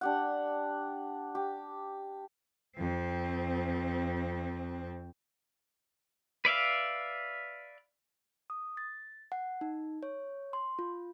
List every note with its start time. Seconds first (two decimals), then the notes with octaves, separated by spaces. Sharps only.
0.01 D4 G4 F#5
1.35 G4
2.78 F2 C4
6.45 B4 D5 E5 F5
8.50 D#6
8.77 A6
9.32 F#5
9.61 D#4
10.03 C#5
10.53 C6
10.79 F4